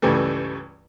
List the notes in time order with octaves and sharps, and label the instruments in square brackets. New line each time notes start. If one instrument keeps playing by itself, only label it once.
[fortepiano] C#2 G2 C#3 E3 G3 A3